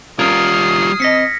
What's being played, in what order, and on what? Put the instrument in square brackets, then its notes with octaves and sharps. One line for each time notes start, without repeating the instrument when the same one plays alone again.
[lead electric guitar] G3 F4 [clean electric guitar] C#4 A#4 [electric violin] D#6 C7 [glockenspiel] F6 G#6
[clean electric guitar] C4 D#5 [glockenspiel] A#6 B6 C#7